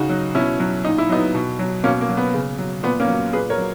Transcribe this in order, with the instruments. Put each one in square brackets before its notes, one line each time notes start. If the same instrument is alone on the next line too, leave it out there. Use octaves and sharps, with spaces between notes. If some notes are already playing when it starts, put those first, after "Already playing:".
Already playing: [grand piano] C#3 D#4 F#4
F#3
B2 C#4 E4
F#3
A#2 D#4
E4
F#3 B3 D#4
B2
F#3
B2 A#3 C#4
A#3
F#3
B3
C#3
F#3
A#2 B3
A#3 C#4
F#3
A#2 G#4 B4
A#4 C#5
F#3